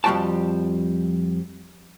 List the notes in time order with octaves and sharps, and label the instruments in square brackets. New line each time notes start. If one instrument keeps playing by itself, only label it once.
[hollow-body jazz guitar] F2 F3 G3 F#4 G5 A5